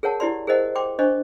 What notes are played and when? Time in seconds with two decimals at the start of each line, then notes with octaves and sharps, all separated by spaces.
0.03 G#4 A#4 C#5 F#5 A5
0.20 E4 G4 D5 C6
0.47 G#4 A#4 C5 D#5 F#5
0.75 G5 C6 D6
0.99 D4 C5 D#5 C#6